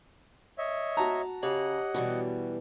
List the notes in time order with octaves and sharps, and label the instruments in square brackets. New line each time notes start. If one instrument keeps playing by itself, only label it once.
[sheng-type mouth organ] C#5 D#5 E5
[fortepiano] F#4 A5 A#5
[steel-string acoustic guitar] C#3 [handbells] G4 C#5 [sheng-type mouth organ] D#5 F#5
[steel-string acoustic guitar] B2 E3 G3 [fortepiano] F#4